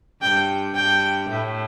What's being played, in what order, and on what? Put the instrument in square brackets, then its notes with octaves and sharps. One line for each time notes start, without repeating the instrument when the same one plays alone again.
[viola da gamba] G2 [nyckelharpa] G5
[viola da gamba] G2 [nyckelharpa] G5
[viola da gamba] A2